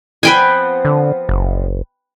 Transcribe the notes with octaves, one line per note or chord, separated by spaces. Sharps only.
F3 B3 C4 B4 G5 G#5
D3
F#1